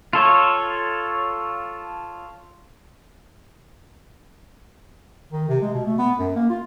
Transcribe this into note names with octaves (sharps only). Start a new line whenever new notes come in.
F4 A4 C#5
D#3
C3
G#3
B2
A3
B3
F#2
A#3
F4